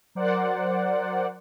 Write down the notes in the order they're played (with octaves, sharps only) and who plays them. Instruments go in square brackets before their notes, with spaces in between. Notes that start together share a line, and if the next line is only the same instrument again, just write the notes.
[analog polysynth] F#3 A#4 C5 D5 F#5